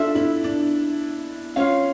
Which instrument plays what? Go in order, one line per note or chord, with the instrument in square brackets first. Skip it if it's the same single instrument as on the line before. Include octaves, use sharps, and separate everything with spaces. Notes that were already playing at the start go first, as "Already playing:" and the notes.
Already playing: [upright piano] D4 [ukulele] F4 A4 E5
[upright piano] E4
D4
[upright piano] C#4 [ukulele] F4 C#5 F5